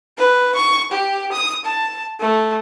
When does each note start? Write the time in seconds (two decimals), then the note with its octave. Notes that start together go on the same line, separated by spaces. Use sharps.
0.18 B4
0.56 C#6
0.92 G4
1.32 D#6
1.65 A5
2.20 A3